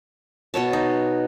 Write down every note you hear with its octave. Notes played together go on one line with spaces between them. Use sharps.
B2 B3 C#5 A5
D#4